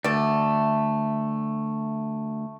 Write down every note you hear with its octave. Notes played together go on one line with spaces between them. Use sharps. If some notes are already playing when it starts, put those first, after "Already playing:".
D2 A3 D5